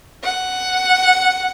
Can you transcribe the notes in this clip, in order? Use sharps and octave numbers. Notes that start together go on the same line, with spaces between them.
F#5